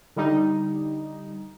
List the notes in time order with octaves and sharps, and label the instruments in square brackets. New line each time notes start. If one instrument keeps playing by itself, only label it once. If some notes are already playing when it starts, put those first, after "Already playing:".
[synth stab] D3 G3 D#4